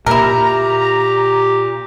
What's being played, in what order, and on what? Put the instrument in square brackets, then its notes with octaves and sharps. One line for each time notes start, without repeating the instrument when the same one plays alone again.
[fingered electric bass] A#2 A#3 [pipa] E4 A#4 [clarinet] G4 [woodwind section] A#5